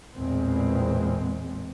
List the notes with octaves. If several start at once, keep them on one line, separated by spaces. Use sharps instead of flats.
A1 E2 A#2 G#3 C4